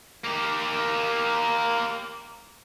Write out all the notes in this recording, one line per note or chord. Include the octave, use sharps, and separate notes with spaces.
A#3 G4